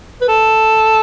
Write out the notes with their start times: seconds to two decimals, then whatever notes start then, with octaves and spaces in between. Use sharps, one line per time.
0.21 B4
0.28 A4